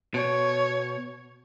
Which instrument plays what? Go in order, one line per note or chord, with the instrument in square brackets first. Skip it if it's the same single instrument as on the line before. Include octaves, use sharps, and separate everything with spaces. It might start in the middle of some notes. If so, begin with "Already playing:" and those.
[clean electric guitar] B2 [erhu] C#5